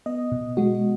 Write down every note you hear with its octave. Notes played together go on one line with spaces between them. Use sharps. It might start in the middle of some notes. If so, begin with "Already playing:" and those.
B3 D#5
B2
G#3 F#4